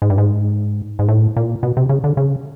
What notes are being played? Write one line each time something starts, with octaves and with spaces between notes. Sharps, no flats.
G#2
G2
G#2
G#2
A2
A#2
B2
C3
C#3
D3
C#3